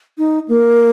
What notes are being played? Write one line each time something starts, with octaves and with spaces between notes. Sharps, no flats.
D#4
A#3